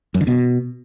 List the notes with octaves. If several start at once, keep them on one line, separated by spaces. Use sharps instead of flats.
F#2
D3
B2